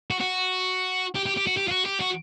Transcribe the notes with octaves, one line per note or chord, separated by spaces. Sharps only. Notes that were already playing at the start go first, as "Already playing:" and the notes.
F#4
F#4
G4
G4
G4
F#4
G4
F4
F#4
G4
F#4